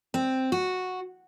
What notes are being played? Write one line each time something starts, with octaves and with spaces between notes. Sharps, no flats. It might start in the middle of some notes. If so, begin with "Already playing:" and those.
C4
F#4